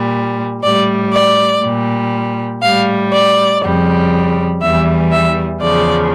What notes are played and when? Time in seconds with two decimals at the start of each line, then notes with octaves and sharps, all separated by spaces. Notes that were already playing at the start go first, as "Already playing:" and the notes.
Already playing: A#2 G3
0.63 A2 G3 D5
1.13 D5
1.63 A#2 G3
2.62 A2 G3 F5
3.13 D5
3.63 F2 C#3 G3
4.62 E2 E3 G3 E5
5.12 E5
5.62 E2 C#3 F3 D5